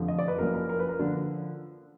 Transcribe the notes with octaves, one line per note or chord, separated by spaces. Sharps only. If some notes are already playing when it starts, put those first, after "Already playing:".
Already playing: F1 F2 D3 F3
D#5
D5
B4
F#1 F#2 F3 A#4
A#4
A#4
B4
A#4
D3 F3 D4